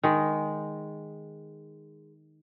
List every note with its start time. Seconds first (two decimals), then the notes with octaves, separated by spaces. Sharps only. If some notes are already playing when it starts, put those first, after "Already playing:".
0.03 D#3 G#3